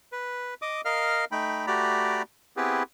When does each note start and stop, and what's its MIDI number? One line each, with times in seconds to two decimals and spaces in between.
0.12 0.54 71
0.62 0.81 75
0.62 0.81 86
0.62 0.81 87
0.85 1.25 70
0.85 1.25 75
0.85 1.25 77
0.85 1.25 89
1.32 1.66 57
1.32 1.66 63
1.32 1.66 79
1.32 1.66 83
1.67 2.22 57
1.67 2.22 66
1.67 2.22 67
1.67 2.22 74
1.67 2.22 82
1.67 2.22 83
2.57 2.83 59
2.57 2.83 60
2.57 2.83 64
2.57 2.83 67
2.57 2.83 68
2.57 2.83 71